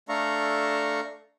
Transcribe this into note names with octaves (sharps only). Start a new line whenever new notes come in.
A3 D4 A4 F5 A#5 C#6